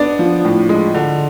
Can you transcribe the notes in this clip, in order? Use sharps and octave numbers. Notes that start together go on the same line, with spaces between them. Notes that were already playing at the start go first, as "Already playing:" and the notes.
Already playing: B3 D4 D5
F3
A2
G#3
D3